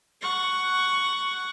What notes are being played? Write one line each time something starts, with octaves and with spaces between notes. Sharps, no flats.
F#5 C#6